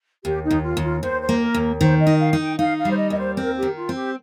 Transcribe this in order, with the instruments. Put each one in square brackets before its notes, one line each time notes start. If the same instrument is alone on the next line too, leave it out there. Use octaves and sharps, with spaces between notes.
[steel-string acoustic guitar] D#2 [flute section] G4
[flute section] D#4
[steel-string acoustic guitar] D#2
[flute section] F4
[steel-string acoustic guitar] D#2
[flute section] F4
[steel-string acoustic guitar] D#2 [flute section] C5
[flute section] C5
[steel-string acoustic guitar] A#3
[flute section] A#4
[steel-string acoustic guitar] D#2
[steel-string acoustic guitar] D#3 [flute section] C5
[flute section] D#5
[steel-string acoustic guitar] D#4
[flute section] F5
[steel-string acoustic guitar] D#4
[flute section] G5
[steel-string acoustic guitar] D#4 [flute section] F5
[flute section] F5
[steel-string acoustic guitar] G3
[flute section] C5
D#5
[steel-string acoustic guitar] D#2 [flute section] D#5
[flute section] C5
[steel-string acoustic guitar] C4 [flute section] A#4
[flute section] G4
[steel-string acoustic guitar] D#3
[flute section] F4
[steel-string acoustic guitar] C4
[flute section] G4